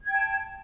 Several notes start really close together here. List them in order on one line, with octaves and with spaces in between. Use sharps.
G#6 G5 A5